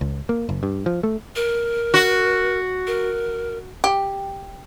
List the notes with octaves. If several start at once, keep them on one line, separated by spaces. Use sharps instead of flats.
C#2
A#3
F#1
G2
F3
A3
A#4
F#4
A#4
G4